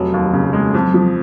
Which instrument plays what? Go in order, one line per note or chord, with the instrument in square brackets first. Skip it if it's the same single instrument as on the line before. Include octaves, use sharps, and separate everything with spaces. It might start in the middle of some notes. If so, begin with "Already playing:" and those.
Already playing: [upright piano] F1 [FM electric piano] F#3
[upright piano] D#2
C#3
G#3
F2
F3